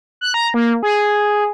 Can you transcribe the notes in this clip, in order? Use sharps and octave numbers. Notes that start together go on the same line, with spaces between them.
F#6
A#5
A#3
G#4